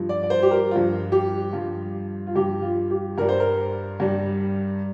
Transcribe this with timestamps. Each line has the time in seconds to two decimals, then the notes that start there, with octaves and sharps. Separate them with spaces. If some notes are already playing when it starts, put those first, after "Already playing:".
Already playing: G2 F3
0.09 D5
0.23 D5
0.30 C5
0.43 G4
0.51 A#4
0.71 G2 F3 F4
1.12 G4
1.53 G2 F3 F4
2.27 F4
2.36 G2 F3 G4
2.62 F4
2.91 G4
3.18 G2 G3 A#4
3.29 C5
3.40 A#4
4.00 G2 G3